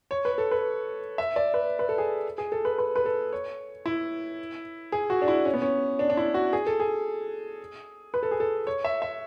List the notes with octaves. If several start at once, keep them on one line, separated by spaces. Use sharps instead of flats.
C#5
B4
A4
B4
E5
D5
B4
B4
A4
G#4
G#4
A4
B4
B4
B4
A4
C#5
E4
G#4
F#4
D4
E4
C#4
B3
C#4
D4
D4
E4
F#4
G#4
A4
G#4
B4
A4
G#4
A4
C#5
E5
E5